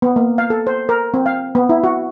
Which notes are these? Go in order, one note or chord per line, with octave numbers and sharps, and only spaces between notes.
B3
A#3
F5
A4
C5
A#4
C4
F5
B3
E4
F#4